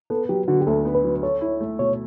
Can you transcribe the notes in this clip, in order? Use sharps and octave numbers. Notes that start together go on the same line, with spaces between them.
B3 A4
F#3 G4
D3 F#4
G4
D2 A4
B3
B4
F#3
A4 C#5
E4
A3
B2 C#5